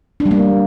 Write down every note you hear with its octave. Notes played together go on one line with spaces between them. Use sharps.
D4
G3
A#3